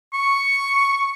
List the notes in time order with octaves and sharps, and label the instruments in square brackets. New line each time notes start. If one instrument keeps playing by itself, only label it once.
[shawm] C#6